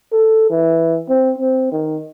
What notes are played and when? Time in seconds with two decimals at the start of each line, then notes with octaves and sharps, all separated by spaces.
0.12 A4
0.50 E3
1.09 C4
1.38 C4
1.72 D#3